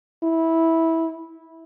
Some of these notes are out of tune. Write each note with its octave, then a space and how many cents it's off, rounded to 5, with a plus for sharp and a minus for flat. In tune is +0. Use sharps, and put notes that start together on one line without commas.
E4 -15